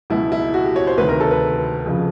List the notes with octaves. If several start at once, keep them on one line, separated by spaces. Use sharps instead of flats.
C#2 B2 F#3 E4
E4
F#4
G4
C#5
C5
D2 C3 D#3 B4
A#4
A4
B4
F2 C#3 F3